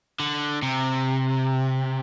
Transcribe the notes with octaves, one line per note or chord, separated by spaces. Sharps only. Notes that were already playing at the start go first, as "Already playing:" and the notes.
D3
C3